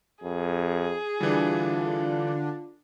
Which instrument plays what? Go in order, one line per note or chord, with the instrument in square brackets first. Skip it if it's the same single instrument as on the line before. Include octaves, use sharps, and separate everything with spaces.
[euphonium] F2 [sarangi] G#4
[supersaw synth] D3 D4 [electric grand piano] E3 G3 [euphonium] F4